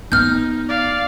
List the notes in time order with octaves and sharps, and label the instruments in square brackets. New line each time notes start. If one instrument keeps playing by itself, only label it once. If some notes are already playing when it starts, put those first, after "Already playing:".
[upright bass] B3 [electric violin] D#4 [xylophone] F6 G6
[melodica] D5 [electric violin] F5